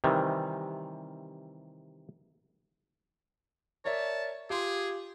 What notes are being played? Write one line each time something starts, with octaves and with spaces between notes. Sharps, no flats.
C3 D#3 E3 G3
A#4 C#5 D5 E5 A5
F4 G4 G#4 C6